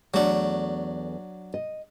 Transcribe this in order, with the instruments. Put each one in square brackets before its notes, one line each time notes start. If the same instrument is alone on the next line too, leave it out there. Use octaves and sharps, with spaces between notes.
[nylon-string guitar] E2 A3 [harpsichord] F#3 D4
[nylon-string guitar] D#5